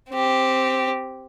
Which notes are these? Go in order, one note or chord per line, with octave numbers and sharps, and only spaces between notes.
C4 G4